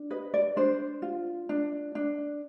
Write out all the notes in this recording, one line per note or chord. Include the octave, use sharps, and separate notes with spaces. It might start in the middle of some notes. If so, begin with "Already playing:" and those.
Already playing: D4
B4 D#5
D5
D4 C5
F4
D4
D4